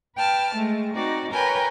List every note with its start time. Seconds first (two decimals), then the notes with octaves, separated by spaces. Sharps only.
0.16 B4 G5 A5 F6
0.55 G#3 A3
0.94 C4 D#4 F#4 D5
1.32 A#4 B4 C#5 G5 G#5 A#5